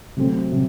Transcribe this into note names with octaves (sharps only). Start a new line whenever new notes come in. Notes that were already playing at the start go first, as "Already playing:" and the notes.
C3 F#3 A3 C4
C3 F#3